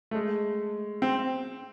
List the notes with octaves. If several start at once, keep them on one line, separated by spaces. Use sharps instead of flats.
A3
G#3
C4